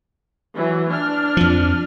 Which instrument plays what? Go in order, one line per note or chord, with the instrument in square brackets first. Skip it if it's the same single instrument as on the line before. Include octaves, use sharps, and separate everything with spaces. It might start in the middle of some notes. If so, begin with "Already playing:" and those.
[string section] E3 F#3
D4 F6
[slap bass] F2 F3